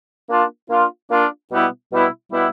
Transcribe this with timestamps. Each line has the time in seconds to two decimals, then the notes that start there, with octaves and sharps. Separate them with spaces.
0.29 A#3 D4 F4
0.69 A#3 D4 F4
1.10 A#3 D4 F4
1.52 B2 G3 B3 E4
1.92 B2 G3 B3 E4
2.32 B2 G3 B3 E4